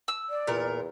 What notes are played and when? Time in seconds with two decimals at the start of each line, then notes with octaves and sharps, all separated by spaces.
0.08 E6
0.29 D5
0.47 E2 A#2 A#4